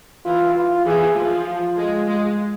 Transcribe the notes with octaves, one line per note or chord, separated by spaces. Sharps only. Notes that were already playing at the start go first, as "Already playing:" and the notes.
E3 F4
F4
E3 G#4
F3 F4
F4
G#3
G#3